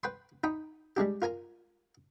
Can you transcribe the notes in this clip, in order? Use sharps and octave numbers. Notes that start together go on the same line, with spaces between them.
B4 G5 B5 C6
D#4 G5 B5
G3 G#3 D4 G4
F4 A#4 G#5 A#5